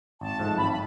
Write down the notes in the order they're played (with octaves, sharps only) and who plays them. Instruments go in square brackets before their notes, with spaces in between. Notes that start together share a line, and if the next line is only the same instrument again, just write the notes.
[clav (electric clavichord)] G#1 [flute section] A5
[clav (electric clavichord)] G#2 F3 A3
[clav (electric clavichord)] G#1 [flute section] B5
[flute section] B5